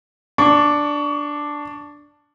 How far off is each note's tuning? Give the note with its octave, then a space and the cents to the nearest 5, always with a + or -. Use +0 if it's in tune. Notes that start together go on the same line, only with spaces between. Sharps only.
D4 +0 C#6 +25